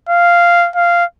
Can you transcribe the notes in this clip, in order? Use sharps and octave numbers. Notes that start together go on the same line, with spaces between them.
F5
F5